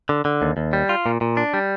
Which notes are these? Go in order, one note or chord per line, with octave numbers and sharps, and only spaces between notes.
D3
D3
D#2
D#2
G3
F4
A#2
A#2
D4
G3